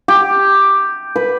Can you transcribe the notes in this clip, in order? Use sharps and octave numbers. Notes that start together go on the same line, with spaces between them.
G4
B4